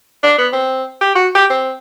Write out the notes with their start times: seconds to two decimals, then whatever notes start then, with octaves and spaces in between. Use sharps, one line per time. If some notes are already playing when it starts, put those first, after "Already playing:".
0.23 D4
0.38 B3
0.53 C4
1.01 G4
1.15 F#4
1.35 G4
1.50 C4